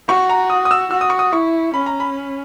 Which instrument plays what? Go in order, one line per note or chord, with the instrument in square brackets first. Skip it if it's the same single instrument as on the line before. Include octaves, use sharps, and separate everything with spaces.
[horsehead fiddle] F#4 [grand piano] C#6
[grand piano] A#5
D#6
D#6
E6
[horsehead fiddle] F#4 [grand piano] E6
[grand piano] D#6
C#6
D#6
[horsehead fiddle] E4 [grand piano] C#6
[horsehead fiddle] C#4 [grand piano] B5
[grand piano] A#5
B5